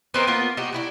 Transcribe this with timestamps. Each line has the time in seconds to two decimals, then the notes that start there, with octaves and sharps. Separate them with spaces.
0.14 B3 C4 D#4 A#4
0.27 A#3 B3 F4
0.57 D#4 F#4 G4
0.73 D4 E4 F#4